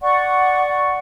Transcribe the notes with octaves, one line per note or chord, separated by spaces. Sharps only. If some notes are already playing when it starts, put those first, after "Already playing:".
D5 F#5 C#6